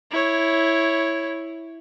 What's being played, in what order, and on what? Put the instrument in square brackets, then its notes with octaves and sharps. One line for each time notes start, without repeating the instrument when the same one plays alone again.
[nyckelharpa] E4 C#5